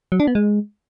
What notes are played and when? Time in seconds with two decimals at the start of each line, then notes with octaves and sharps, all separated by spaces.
0.12 F#3
0.20 D4
0.27 B3
0.35 G#3